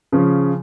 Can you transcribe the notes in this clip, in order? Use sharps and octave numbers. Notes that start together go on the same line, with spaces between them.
C#3 F3 C#4